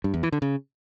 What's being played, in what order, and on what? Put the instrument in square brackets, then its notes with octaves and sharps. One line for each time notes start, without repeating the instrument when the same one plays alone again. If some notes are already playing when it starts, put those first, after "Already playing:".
[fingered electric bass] G2
E2
E3
D3
C#3